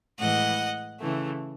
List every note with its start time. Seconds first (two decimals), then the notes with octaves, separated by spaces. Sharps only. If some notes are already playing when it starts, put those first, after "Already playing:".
0.18 A2 E3 G#3 D#5 F#5
1.00 C#3 E3 A3